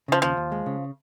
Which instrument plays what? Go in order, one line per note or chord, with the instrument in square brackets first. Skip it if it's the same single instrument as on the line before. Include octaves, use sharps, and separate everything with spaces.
[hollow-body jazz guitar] C#3 [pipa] F3
[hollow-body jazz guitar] D#2 [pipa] F3
[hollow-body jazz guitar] D#2
G#3
C#3